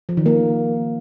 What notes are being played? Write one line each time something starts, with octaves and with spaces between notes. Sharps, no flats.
F3
D#3
A#3